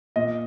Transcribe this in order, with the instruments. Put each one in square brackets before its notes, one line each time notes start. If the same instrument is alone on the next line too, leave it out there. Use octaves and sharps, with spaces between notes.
[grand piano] A#2 D#5